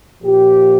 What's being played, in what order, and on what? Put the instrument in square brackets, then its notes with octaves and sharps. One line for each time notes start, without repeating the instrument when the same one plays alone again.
[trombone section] A#2 F3 G4